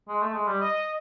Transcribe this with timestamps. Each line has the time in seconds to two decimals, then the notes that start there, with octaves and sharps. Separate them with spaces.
0.09 G#3
0.22 A3
0.34 G#3
0.48 G3
0.61 D#5